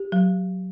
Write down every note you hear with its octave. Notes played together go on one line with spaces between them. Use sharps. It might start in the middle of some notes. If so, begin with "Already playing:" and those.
Already playing: G4
F#3